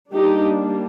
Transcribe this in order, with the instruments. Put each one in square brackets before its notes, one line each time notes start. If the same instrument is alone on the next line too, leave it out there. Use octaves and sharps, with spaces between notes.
[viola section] G3 A#3 D4 D#4 G4